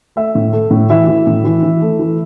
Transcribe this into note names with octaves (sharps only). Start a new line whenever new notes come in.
A3 E5
A2
A3
A2
E3 E5
E3
A2
E3
E3
A3
E3